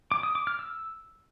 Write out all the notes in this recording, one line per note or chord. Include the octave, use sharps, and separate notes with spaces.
D6
D#6
D6
F6
E6